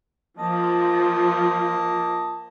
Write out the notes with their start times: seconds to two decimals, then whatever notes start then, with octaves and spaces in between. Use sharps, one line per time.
0.39 F3 A#3 D#5 A5